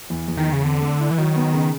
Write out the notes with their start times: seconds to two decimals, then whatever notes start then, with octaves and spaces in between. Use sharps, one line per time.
0.10 E2
0.28 E2
0.37 D#3
0.47 E2
0.53 C#3
0.64 D3 C4
0.81 A3
1.00 E4
1.11 E3
1.18 D#3 F#3
1.36 B3
1.54 C#3